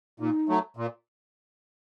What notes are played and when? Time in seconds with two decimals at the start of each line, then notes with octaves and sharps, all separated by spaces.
0.19 A#2 D#4
0.49 F#3 A3
0.77 A#2